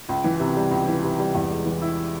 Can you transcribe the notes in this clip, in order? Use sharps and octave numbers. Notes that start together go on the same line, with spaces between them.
C#2
E3
C3
G3
C#2
E3
C3
G3
E2
G#3
E3
E4